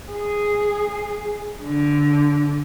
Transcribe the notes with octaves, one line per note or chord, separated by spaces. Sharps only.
G#4
D3